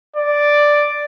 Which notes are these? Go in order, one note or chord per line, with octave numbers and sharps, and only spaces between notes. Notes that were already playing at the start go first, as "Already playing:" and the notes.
D5